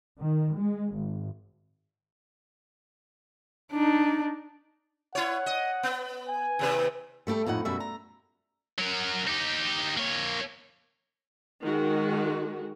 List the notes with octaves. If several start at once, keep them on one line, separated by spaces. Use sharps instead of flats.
D#3
G#3
G#1
D4 D#4
E4 C#5 F#5
D#5
B3
G#5
D#2 C3 B4
G3 A3 B3 G4 A4
F2 A2 D#4 F#5
F#2 B2 G3 F#4 E5
A#5
F#3 A#4
D#4 G4
A#3 C#5
D#3 G#3 F#4